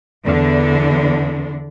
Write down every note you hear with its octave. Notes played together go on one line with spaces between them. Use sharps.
E2 D3 D4